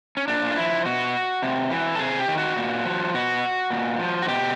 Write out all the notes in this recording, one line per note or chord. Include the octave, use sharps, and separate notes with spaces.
C#4
A#2 D4
F4
F3 E4
B2 F#4
C3
E3
A4
C3 G#4
G4
D#3
F#4
A#2
F3
B2 F#4
A#2
F3
F#4
B2 G4